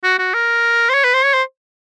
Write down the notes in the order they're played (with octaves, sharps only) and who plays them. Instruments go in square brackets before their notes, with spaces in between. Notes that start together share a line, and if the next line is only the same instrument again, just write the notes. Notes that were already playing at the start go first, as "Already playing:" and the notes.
[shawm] F#4
F#4
A#4
C5
C#5
B4
C5
C#5
C5